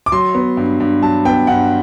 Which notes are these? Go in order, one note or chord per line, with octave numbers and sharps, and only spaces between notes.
D6
F#3 C6
B3
G2
G2
F#3 A5
B3 G5
G2 F#5